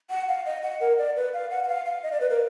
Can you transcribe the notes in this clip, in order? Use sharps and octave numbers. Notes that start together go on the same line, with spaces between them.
F#5
F5
D#5
F#5
A#4
D5
B4
F5
F#5
F#5
F5
F5
D#5
D5
B4
A#4